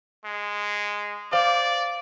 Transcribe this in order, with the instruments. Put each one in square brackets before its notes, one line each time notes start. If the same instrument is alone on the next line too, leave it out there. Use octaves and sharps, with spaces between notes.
[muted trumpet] G#3
[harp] C5 F5 D6 [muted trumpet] D5